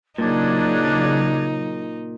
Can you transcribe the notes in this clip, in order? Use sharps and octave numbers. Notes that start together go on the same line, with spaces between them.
A#2 C#3 F#3 D4 D#4 G#6